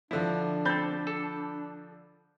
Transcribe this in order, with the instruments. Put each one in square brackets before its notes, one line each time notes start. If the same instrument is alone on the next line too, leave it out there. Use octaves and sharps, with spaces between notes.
[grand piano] D3 F3 [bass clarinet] D4 [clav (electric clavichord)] E4
[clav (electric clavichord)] C4 A4 [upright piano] B5 G6 A6
[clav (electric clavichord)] A4